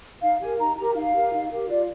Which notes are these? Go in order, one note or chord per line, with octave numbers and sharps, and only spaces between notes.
D#4 F5
G4 A#4 G#5
D#4 A#5
G4 A#4 A#5
D#4 F5
G4 A#4
D#4
G4 A#4
F4 D5